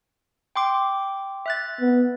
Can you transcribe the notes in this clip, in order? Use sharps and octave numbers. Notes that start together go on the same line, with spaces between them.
G5 C6 D6
E5 F#6 A6
B3